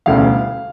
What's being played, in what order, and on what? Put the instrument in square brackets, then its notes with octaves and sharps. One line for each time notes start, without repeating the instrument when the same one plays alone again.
[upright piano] E1 D2 C#3 E3 G3 F5